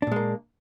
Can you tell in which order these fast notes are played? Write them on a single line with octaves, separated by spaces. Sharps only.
D4 A#2 G#3 A#3